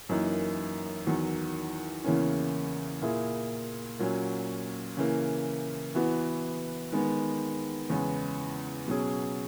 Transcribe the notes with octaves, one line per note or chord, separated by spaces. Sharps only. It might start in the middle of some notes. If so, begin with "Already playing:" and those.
F#2 E3 A#3 D#4
E2 D#3 F#3
E2 C#3 E3 A#3 C#4
A#2 A#3 E4 G#4
A#2 F#3 C#4
C#3 E3 A#3
E3 B3 F#4
D#3 G#3 B3
E2 C#3 G#3 B3
B2 F#3 C#4 G#4